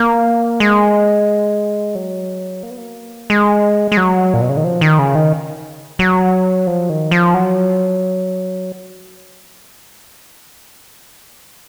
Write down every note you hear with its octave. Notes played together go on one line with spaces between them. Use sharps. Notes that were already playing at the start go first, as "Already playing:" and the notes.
Already playing: A#3
G#3
F#3
A#3
B3
A#3
G#3
G#3
F#3
A#2
B2
C#3
D#3
F3
D#3
C#3
D#3
F#3
F3
D#3
F3
F#3